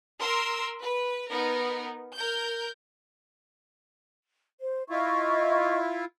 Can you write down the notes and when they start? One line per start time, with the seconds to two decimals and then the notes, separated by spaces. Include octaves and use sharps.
0.21 A#4 C6 E6
0.82 B4
1.31 B3 D#4 A#4
2.14 A#4 G6
4.60 C5
4.90 E4 F4 D#5 E5 C#6